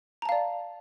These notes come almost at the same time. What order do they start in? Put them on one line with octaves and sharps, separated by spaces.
A#5 A5 F5 D5